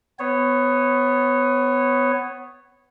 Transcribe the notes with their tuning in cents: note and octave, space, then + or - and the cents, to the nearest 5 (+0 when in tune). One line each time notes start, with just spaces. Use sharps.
B3 +15 C#5 -15